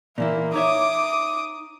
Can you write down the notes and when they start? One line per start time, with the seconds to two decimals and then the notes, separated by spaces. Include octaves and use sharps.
0.18 A#2 E3 A#3 E4
0.54 D#4 C#5 E5 D6 D#6